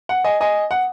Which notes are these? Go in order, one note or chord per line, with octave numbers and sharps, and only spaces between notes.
F#5
D#5 G#5
D#5 G#5
F#5